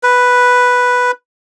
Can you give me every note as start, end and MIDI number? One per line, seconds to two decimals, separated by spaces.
0.03 1.11 71